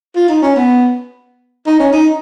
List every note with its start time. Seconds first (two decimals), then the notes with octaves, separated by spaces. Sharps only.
0.16 F4
0.29 D#4
0.42 C#4
0.56 B3
1.67 D#4
1.80 C#4
1.93 D#4